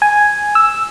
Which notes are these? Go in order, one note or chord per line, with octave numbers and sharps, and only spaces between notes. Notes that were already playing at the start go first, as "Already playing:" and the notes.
G#5
E6